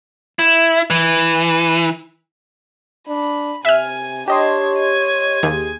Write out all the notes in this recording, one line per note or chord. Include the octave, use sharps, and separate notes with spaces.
E4
E3
D4 B5
C3 E5 G#5 F6
D4 G4 C#5 D#5 C6 G#6
G#6 D#7
D#2 G#4